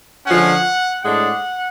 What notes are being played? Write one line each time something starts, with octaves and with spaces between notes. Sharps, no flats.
D3 F3 G#3 C#4 F#5
A2 G#3 D4 F#5